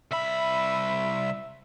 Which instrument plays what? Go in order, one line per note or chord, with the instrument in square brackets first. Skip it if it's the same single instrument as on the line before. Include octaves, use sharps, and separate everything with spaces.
[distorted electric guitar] C2 B5 [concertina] E5